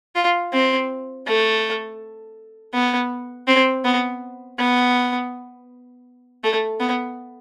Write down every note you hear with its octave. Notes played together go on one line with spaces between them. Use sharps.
F4
C4
A3
B3
C4
B3
B3
A3
B3